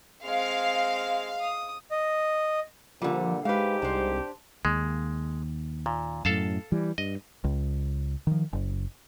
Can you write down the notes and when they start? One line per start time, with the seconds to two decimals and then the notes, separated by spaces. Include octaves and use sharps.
0.25 G#3 C4 F5
1.41 D#6
1.91 D#5
3.02 A#2 D3 F3 G3
3.45 G#2 G#3 G4 B4 F5
3.82 C2 D4 C5
4.65 D#2 G#3
5.86 A#2
6.25 F#2 A2 A4 F5 A5
6.72 E3 G3
6.98 G2 D#5
7.44 C#2
8.27 D#3 F3
8.53 F#1